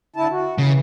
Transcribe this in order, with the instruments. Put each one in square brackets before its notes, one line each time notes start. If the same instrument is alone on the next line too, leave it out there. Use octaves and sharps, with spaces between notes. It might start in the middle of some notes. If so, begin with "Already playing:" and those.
[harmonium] D3 E4 A5
F#4
[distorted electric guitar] C#3 [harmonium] E3